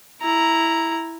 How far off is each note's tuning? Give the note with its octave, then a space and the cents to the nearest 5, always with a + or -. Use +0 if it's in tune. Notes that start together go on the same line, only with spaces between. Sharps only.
E4 +0 A#5 +0